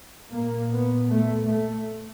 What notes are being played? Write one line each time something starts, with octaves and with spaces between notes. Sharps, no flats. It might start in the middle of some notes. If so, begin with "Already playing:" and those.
A#2 A#3
B3
A3
A3